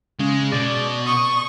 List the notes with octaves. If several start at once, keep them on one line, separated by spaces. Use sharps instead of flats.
C#3 G#3
B2 D5
C#6 D#6